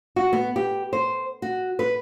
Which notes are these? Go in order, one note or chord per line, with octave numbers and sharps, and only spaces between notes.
F#4
B3
G4
C5
F#4
B4